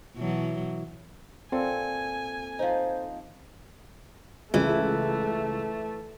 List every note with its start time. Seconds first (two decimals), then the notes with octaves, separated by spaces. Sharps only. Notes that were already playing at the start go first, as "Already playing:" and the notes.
0.16 B2 E3 F#3
1.52 A#2 C4 A4 G#5
2.59 F3 D#4 C5
4.54 C#2 E3 A3